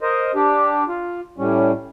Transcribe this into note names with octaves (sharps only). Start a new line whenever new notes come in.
A#4 C5 D#5
D4 G4
F4
A2 G3 C#4